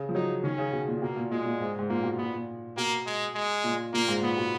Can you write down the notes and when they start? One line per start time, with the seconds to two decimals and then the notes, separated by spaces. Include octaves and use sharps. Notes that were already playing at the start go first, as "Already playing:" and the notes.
Already playing: C#3
0.09 F3
0.15 F#3 D#4
0.43 D#3 C#4
0.58 C#3
0.73 B2
0.88 A#2
1.02 B2 A#3
1.16 A#2
1.31 A#2 G#3
1.46 A#2
1.60 G#2
1.79 G#2
1.89 A#2 A#3
2.04 B2
2.18 A#2 B3
2.33 A#2
2.77 B2 A#3
3.06 G#3
3.35 G#3
3.64 A#2
3.93 A#2 A#3
4.08 G#2
4.22 A#2 B3
4.38 B2